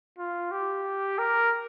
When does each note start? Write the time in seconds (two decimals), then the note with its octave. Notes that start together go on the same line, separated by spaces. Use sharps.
0.19 F4
0.51 G4
1.19 A#4